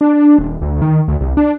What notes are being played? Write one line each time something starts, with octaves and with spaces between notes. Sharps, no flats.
D4
D#1
D2
D#3
D2
C2
D4